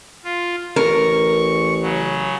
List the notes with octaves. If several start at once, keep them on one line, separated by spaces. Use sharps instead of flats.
F4
A1 A#4 C#6
C#3 F#3